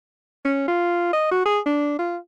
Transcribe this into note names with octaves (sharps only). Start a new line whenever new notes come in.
C#4
F4
D#5
F#4
G#4
D4
F4